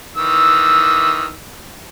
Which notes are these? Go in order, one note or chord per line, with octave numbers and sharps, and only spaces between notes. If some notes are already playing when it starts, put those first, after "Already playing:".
D#3 E3 E6